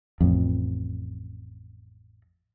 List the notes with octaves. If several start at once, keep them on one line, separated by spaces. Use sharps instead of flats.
A1 F2